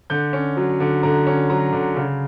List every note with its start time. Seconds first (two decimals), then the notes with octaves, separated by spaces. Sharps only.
0.10 D3 G6
0.33 C#4
0.57 F#3
0.80 D3
1.03 D3 A#5
1.27 C#4
1.49 F#3 A#5
1.73 D3
1.96 C#3